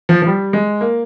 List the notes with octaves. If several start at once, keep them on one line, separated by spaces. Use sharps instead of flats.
F3
F3
G3
G#3
A#3